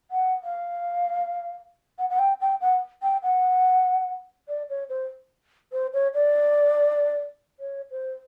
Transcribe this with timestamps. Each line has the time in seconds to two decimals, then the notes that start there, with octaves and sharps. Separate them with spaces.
0.11 F#5
0.43 F5
1.98 F#5
2.10 F#5
2.19 G5
2.41 G5
2.61 F#5
3.03 G5
3.23 F#5
4.48 D5
4.69 C#5
4.89 C5
5.72 C5
5.93 C#5
6.14 D5
7.60 C#5
7.91 C5